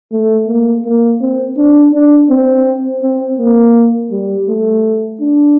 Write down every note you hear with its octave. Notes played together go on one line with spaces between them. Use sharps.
A3
A#3
A#3
C4
D4
D4
C4
C4
A#3
G3
A3
D4